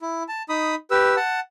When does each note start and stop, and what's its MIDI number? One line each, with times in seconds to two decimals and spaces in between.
0.02 0.23 64
0.28 0.43 81
0.49 0.75 63
0.49 0.75 83
0.49 0.75 87
0.91 1.16 67
0.91 1.16 71
0.91 1.16 88
1.16 1.40 78
1.16 1.40 81